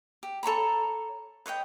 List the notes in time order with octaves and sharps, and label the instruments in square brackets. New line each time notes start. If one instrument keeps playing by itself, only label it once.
[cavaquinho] G4
A4 C#5 A#5 B5
B4 C#5 D#5 G5